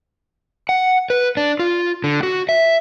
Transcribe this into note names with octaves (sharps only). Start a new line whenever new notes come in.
F#5
B4
D4
F4
D3
F#4
E5